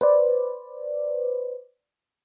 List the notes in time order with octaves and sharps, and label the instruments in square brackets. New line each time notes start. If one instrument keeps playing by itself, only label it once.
[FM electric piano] B4 C5 D5